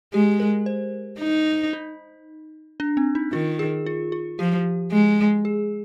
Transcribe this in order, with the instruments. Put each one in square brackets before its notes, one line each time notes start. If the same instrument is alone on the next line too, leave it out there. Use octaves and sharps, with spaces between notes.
[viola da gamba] G#3 [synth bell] G4
[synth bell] A#4
C5
[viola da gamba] D#4
[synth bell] D#4
D4
C4
D#4
[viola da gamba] D#3 [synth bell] F4
[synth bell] G#4
F4
F4
[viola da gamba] F3 [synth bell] G4
[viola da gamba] G#3
[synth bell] G#4